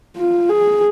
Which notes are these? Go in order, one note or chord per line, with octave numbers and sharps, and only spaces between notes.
F4
G#4